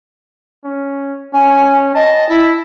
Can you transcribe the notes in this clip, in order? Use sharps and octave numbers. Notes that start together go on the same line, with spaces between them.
C#4
C#4 G#5
D#5 A5
E4